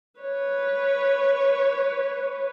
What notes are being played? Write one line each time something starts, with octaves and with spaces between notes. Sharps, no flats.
B4 C#5